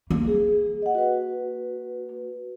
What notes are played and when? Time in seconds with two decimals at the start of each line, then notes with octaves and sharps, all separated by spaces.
0.10 A#3
0.27 G#4
0.82 D#5 F#5
0.95 F#4 B4